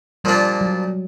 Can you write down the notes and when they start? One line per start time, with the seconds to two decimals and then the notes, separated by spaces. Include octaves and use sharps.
0.24 A#2 F3 G3 A#3 D4
0.61 F#3